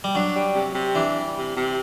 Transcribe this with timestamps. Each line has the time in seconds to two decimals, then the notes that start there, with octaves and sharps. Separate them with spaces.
0.04 G3
0.15 F#3 D4
0.35 G3
0.54 C3
0.75 C3
0.95 E3 D4
1.15 G3
1.35 C3
1.56 C3